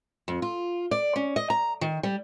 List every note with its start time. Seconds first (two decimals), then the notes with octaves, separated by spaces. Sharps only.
0.28 F2
0.42 F4
0.91 D5
1.16 C#4
1.36 D#5
1.50 A#5
1.81 D#3
2.03 G3